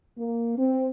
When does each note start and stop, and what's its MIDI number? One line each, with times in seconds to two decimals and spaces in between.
0.18 0.57 58
0.58 0.88 60